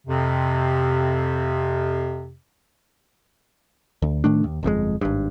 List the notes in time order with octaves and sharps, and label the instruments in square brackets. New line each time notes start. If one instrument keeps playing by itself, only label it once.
[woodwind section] F2 C3
[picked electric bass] D2
A2 D#3 A3 D4
D#2
G1 F2 C#3 G#3
G#1 G2